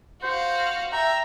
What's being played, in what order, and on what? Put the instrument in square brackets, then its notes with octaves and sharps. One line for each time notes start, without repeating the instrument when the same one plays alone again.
[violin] F#4 F5 [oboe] C5
[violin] E5 [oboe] G5 [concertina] A#5